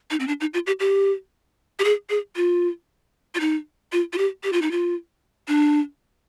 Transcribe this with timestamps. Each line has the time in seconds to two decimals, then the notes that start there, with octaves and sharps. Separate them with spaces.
0.11 D#4
0.20 C4
0.28 D4
0.41 D#4
0.54 F4
0.67 G4
0.80 G4
1.79 G4
1.84 G#4
2.10 G#4
2.36 F4
3.35 F4
3.40 D#4
3.92 F4
4.13 F4
4.18 G4
4.44 G4
4.53 F4
4.62 D#4
4.71 F4
5.48 D4